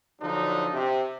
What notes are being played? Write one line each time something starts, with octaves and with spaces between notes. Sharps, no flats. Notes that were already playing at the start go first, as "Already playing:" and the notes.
D3 F3 F#3 D4 D#4
C3